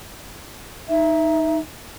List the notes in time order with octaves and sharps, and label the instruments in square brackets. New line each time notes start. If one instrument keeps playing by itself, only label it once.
[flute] D#4 [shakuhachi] E5